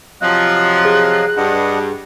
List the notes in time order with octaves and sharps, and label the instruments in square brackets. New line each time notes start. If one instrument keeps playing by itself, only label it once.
[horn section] C3 F3 [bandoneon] F#3 D#5 F5 [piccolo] F#6
[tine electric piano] G#4
[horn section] G2 [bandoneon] D4 D#5 F#5